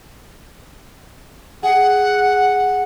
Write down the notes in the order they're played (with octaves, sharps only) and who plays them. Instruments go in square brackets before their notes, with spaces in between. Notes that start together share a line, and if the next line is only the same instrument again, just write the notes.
[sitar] G#4 [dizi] F#5